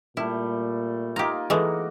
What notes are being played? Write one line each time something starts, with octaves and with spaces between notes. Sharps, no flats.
A#2 G3 A3 E4
A#3 D#4 F4 G4 A#5
E3 G#3 A3 F#4